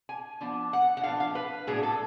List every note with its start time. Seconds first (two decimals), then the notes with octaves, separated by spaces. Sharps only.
0.09 G#5
0.41 F3 B3 D4
0.73 F#5
0.97 F#5
1.04 F3 B3 D4 F5
1.20 F5
1.35 B4
1.67 A2 F#3 B3 D4 G#4
1.83 A4